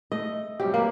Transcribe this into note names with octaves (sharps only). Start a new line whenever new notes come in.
A3 D#5
F#2 C3 G3 G4
A#3 G4 A#4 B4